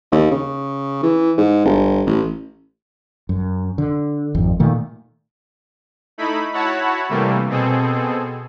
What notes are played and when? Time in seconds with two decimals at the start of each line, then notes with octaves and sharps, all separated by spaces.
0.12 D#2
0.31 C#3
1.03 E3
1.38 G#2
1.65 G1
2.06 A1
3.29 F#2
3.78 D3
4.35 G#1 F2
4.60 A#2 D#3 A3
6.18 A3 D#4 E4 B5
6.53 E4 F#4 C#5 F#5 A5 B5
7.09 C3 E3 G3 A3 A#3
7.49 B2 C4 G#4 A4